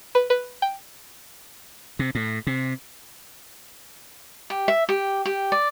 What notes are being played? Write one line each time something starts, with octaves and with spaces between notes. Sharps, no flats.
B4
B4
G5
C3
A2
C3
G4
E5
G4
G4
D5